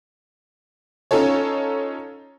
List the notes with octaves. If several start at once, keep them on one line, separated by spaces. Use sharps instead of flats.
C#4 D#4 F4 A4 C#5